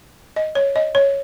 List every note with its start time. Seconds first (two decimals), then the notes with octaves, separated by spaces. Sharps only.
0.36 D#5
0.55 C#5
0.76 D#5
0.95 C#5